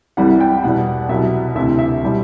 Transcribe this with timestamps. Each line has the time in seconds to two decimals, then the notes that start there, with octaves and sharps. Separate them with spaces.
0.17 C2 C3 E3 G3 F#5
0.40 G5
0.64 E2 B2 G3 F#5
1.09 C2 B2 F#3 E5
1.55 D2 C3 E3 E5
1.79 E5
2.04 B2 G3